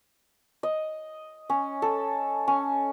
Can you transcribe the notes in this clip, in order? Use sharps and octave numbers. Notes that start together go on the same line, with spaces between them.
D#5
C#4
A4
C#4